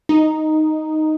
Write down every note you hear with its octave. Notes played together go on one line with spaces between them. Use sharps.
D#4